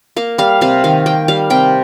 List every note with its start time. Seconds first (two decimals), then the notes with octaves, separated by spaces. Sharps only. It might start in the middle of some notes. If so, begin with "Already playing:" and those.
0.16 A#3 F5
0.38 G3 F5
0.61 C3 F5
0.84 D#3 F5
1.06 A#3 G5
1.28 G3 F5
1.50 C3 G5